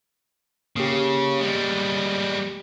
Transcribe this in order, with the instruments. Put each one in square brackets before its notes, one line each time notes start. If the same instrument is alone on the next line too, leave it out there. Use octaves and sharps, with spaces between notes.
[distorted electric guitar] C#3 [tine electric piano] A#3 G4
[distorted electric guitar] G3 G#3